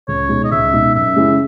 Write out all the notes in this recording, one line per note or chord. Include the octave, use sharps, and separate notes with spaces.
C#2 C#5
B2 G#3 D#4
D#5
C#2 E5
B2 G#3 D#4
F#2 E5
C#3 G#3 C#4 E4